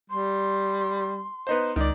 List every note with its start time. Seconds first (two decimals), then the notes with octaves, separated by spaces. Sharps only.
0.10 G3 C6
1.47 B3 D#4 C5
1.76 C#2 D#3 D5